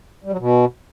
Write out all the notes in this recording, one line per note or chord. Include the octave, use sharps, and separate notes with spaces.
G3
F#3
B2